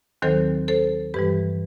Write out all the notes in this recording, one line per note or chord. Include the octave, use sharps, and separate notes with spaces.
D#2 D#3 F#3 C4 A4 C5
A4 C5
G2 E3 G3 G4 B4